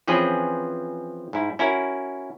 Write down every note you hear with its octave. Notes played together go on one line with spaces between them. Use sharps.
E3 F3 C4 C#4 G#4 B4
G#2 E4
C#4 E4 F#4 A#4